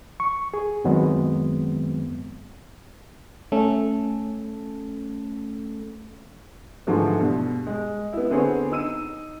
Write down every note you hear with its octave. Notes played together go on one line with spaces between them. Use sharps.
C#6
G#4
F#2 D#3 F#3 G#3 B3 C4
A3 C#4 A4
G#2 D3 E3 F3 A3
G2 B2
G#3
B3 E4
D3 B3 C4 G#4 C#5
D#4 E6 D#7